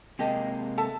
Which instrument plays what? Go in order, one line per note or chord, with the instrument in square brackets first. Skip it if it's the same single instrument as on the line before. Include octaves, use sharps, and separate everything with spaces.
[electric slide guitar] C3 G#3 A#3 [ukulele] G4 D#5 A5
[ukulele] A4 E5 A5